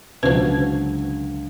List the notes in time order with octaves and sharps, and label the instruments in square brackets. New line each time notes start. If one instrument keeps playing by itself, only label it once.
[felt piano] C#2 D3 F#3 [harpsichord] B2 F3 [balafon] C#4